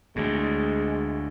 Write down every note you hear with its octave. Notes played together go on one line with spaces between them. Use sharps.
D2 A2 G#3